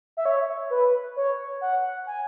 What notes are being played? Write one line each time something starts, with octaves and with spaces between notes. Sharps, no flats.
E5
C#5
B4
C#5
F#5
G#5